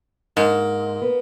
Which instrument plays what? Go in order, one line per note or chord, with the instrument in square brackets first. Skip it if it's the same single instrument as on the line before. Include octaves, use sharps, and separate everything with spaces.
[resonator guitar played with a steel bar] G#2 [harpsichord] A#3 A#4
[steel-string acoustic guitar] B3